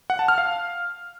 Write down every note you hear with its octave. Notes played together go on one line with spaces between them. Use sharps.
F#5
A5
F6
F5